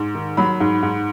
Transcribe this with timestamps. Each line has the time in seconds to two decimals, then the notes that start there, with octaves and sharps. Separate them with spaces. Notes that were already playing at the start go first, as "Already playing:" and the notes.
Already playing: G#2
0.15 D#3
0.37 F#3 B5
0.60 G#2
0.83 G#2